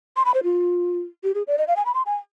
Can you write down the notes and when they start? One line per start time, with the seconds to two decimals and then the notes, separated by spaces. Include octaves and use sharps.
0.16 C6
0.25 B5
0.34 C5
0.44 F4
1.24 G4
1.35 G#4
1.47 D5
1.58 D#5
1.67 F5
1.76 G#5
1.86 B5
1.94 C6
2.06 G#5